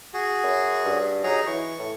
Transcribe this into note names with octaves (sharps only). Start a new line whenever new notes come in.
F#4 G#4
F#2
G2
F#3 D#4 G#4 A#5
E3 C#6
A2